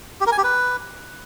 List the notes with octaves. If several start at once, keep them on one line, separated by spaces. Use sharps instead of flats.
G4
A#4
G#5
G4
B4